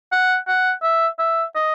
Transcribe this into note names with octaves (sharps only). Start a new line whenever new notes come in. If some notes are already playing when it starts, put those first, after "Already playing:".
F#5
F#5
E5
E5
D#5